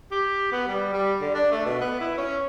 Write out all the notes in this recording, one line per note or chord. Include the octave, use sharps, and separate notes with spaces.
G4
B3
G3
G3
D3
D4
A3
B2
B3
E4
C#4